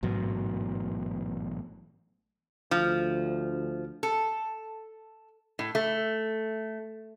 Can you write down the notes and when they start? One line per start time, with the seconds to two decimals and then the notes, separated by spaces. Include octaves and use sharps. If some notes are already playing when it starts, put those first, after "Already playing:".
0.03 A1 G#2 B2 F#3
2.71 D2 F3
4.03 A4
5.59 A2
5.75 A3